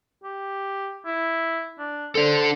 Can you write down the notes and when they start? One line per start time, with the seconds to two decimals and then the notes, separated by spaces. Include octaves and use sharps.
0.24 G4
1.06 E4
1.79 D4
2.15 D4 A4 C5